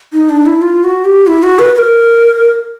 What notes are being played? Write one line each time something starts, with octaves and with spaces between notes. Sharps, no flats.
D#4
D4
E4
F4
F#4
G4
E4
F#4
B4
B4
A#4